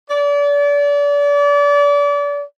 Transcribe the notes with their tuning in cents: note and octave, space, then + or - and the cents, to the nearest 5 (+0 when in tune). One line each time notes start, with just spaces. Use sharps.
D5 -35